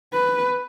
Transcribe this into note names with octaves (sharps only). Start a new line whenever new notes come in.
B4